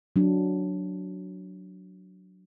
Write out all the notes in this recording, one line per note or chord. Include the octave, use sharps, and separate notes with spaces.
F#3 D4